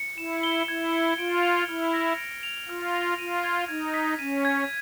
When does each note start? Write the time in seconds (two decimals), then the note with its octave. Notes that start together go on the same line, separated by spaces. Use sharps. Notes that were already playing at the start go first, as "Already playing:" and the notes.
Already playing: C#7
0.17 E4 E7
0.43 G7
0.68 E4 G#6
0.93 C#7
1.18 F4 D7
1.43 F7
1.68 E4 F6
1.93 A#6
2.18 D7
2.43 F7
2.69 F4 F6
2.94 A#6
3.18 F4 D#7
3.44 G#6
3.68 D#4 G#6
3.94 B6
4.19 C#4 D#7
4.45 G#6